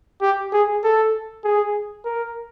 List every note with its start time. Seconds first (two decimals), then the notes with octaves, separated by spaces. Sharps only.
0.22 G4
0.53 G#4
0.84 A4
1.44 G#4
2.05 A#4